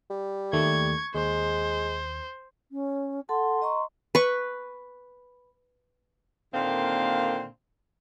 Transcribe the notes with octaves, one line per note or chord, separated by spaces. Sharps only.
G3
D#2 D#3 A3 C#6 G#6
D#2 G#3 C5
C#4
A4 F#5 A5 C6
D#5 A#5 C#6
B4 C#6
A#2 D3 D#3 A#3 C4 F5